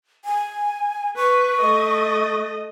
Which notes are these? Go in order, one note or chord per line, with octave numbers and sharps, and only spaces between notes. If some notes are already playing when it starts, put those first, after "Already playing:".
G#5
B4 C#6
A3 D#5